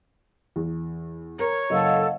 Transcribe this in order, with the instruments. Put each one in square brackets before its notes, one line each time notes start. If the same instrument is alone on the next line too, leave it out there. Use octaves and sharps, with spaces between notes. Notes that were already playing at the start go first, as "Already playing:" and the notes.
[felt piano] E2
[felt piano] A#4 [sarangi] C#5
[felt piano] F#1 [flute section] A4 [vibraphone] D#5 F5 F#5